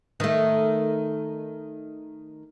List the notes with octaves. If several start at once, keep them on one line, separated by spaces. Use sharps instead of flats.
D#3 A3